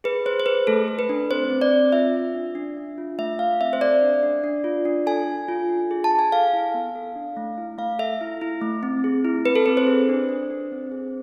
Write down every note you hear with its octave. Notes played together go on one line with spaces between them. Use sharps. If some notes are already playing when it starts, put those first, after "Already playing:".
G#4 B4
G#4 C5
C5
G#4 B4
A3 A4
A4
B4
D4
C4 C5
C4
D5
C4
F4 E5
F4
D4
D4
D4
F4
A3 E5
A3 F5
C4 E5
C5
A4 D5
D4
D4
D4
F4
D4
A4 G#5
A4
F4
D4
G#4
A5
G#4
G#5
A4 F5
E4
B3
A4
D4
A3
E4
A3 F5
A4 E5
E4
E4
A3
C4
G#4
E4
C4 B4
A4
C4 B4
C5
G#4
D4
D4
D4
C4
G#4